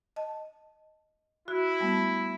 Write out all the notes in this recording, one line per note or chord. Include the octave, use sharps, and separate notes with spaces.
D#5 A5
E4 F#4
G3 A3 B3